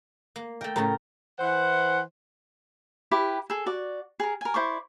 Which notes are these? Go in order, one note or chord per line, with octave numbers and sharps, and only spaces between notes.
A#3
A3 A#4 G5
A2 C#3 A3 A#4 A#5
E3 C5 F#5
E4 G4 B4 D6
G#4 A4
F#4 D5
G#4 A#4
A#4 G#5
E4 C5 D5 C#6